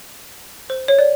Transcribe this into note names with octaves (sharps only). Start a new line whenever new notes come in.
C5
C#5
D5